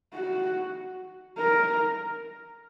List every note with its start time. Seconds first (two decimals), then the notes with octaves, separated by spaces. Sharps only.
0.14 F#4
1.38 A#4